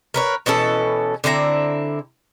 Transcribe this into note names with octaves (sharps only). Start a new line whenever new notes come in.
A#4 B4 C#5
B2 E3 C#4 A4
D3 C4 E4 A#5